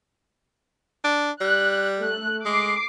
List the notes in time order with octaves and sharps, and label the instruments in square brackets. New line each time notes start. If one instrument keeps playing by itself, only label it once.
[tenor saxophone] D4
[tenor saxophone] G3 [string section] F#6
[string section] A3 F#6
[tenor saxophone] G#3 [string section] D6 C7